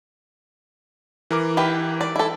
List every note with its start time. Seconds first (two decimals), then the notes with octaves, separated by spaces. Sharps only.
1.31 E3 A#4 D6
1.57 E4 G4 B4
2.01 D5
2.16 E4 A4